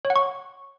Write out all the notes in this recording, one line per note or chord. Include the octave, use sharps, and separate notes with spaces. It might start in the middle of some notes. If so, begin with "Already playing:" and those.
C#5
F#5
C#6